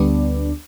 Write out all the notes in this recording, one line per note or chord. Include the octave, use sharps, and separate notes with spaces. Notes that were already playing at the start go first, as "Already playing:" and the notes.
Already playing: D2 D3 G3 B3 D4